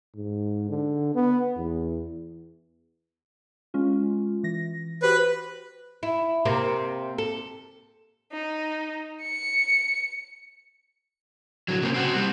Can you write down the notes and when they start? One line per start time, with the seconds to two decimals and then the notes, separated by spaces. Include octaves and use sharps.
0.15 G#2
0.69 D3
1.15 B3
1.57 E2
3.74 G#3 C#4 F4
4.44 E3 A#6
5.02 F#4 G4 B4 C5
6.03 E4
6.45 C3 A#3 C4
7.18 A4
8.32 D#4
9.22 C#7
11.68 D3 F#3
11.82 C#3 A#3 C4
11.94 C4 F#4
12.13 G3 C4